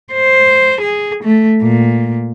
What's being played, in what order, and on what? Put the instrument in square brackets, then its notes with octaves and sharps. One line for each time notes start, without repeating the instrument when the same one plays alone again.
[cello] C5
G#4
A3
A#2